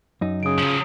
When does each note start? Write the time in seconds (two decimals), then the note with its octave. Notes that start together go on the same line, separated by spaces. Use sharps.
0.21 F#2 D#4
0.43 C#3 D#6 D7
0.58 F3 F#3